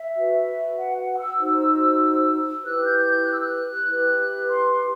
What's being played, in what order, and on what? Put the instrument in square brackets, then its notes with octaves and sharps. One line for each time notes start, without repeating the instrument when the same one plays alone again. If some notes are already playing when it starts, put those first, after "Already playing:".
Already playing: [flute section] E5
F#4 B4
F#5
F#5
E6
D#4 F#4 C5
E4 G4 B4 F#6
G6
G6
F#6
E6
F#6
E4 G4 B4
C6